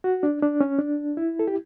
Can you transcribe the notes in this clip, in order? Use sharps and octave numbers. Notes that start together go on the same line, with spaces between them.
F#4
D4
D4
C#4
D4
E4
A4
G4